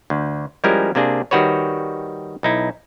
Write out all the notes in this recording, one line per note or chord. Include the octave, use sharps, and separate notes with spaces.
D2
F3 G3 G#3 C#4 E4 A#4
C3 A#3 D4 G#4
D#3 G3 F#4 B4 C#5
B1 D#4 E4